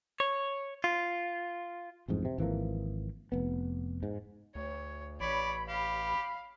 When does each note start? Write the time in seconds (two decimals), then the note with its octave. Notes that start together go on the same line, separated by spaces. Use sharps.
0.20 C#5
0.84 F4
2.08 A1 F2 G#2
2.25 C3
2.38 G#1 E3 F3 A#3
3.32 F1 B3
4.03 G#2
4.55 D2 C#5
5.20 A1 C#5 D5 B5
5.68 G4 F5